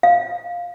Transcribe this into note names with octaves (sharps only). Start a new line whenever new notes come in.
F5